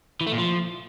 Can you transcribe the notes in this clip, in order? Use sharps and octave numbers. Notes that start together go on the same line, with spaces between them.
E3
A3
A#2
F3